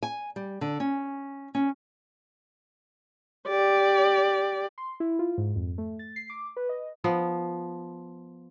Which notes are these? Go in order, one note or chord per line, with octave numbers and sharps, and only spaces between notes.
G#5
G3
D3
C#4
C#4
G4 D5
C6
E4
F4
G#2
F2
A3
A6
C7
D6
B4
D#5
F3 B3